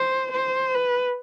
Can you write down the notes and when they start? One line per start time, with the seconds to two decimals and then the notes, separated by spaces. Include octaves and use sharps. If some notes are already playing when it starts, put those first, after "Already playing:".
Already playing: C5
0.31 C5
0.74 B4